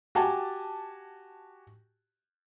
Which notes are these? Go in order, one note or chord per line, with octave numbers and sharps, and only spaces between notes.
F#4 G4 G#5 A5